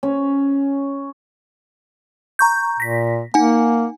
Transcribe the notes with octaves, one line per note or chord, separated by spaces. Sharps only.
C#4
A#5 C#6 G6
A#2 A#6 B6
A#3 D#4 F#5 G#5